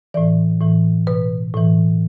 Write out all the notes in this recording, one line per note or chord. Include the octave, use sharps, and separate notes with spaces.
A2 E3 D5
A2 E3
B2 B4
A2 E3